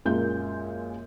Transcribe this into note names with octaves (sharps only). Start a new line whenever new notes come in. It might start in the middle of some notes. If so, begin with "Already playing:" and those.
F#2 A#2 G#3 F4 A#4 G6